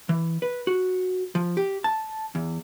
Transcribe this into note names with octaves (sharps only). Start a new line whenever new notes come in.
E3
B4
F#4
F3
G4
A5
E2